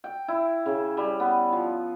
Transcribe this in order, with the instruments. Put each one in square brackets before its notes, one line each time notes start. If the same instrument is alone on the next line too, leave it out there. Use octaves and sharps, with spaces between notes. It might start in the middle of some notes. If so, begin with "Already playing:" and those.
[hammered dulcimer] G5
E4
C#3
G3
B3
F3